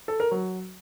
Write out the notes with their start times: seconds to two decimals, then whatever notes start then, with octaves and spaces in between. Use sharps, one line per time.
0.08 A4
0.20 A#4
0.31 F#3